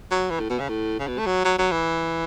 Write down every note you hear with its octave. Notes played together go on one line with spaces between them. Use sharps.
F#3
E3
A2
B2
C#3
A2
C#3
B2
A3
F#3
F#3
F#3
E3